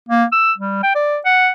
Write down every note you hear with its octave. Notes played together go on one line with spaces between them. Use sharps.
A#3
E6
G3
G5
D5
F#5